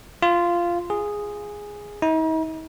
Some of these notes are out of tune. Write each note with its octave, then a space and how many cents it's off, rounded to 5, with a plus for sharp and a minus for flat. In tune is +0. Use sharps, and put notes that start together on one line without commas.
F4 -10
G#4 -5
D#4 +45